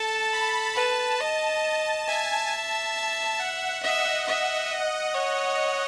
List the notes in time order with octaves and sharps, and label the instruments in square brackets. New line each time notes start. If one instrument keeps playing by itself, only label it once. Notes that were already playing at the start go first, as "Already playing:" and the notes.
Already playing: [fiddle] A4 [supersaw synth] A5
[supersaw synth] B5
[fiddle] B4 [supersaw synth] A5
[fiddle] D#5
[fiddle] E5 [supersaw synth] G#5
[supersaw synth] A5
A5
F#5
[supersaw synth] D#5 [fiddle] E5
[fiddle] E5
D#5
C#5